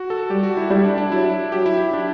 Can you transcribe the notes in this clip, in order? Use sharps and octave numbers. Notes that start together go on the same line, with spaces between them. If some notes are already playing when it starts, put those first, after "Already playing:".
Already playing: F#4
A4
G3 G4
F#4
E4
G3 E4
D4
D4
F#3 E4
F#3 G4
E4
E4
D4